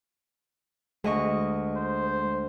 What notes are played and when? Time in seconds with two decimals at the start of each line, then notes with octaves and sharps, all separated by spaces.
1.04 D2 G#3 D#5 C#6
1.76 C5